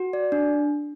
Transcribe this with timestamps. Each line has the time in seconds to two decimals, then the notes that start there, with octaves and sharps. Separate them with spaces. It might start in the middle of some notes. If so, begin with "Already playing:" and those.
Already playing: F#4
0.13 D5
0.32 D4